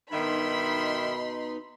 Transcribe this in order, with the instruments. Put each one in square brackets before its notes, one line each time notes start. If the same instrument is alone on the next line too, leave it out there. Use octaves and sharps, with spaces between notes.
[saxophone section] G2 D#3 E5 [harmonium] B2 D#4 [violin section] B5 C6